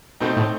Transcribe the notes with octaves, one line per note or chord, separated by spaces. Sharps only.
B2 A3 C4 D#4
A2